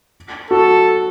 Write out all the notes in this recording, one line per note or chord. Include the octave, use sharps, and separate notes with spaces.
F#4 A4